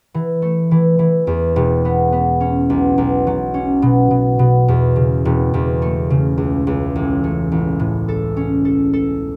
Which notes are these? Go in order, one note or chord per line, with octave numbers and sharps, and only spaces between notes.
E3
A3
E3
E3
E2
E1
B3
B3
C#4
B1
B1
F#3
C#4
B2
B2
B2
E2
C#3
E1
E2
A3
C#3
C#2
C#2
A1
A3
A1
A2
A4
C#4
A4
A4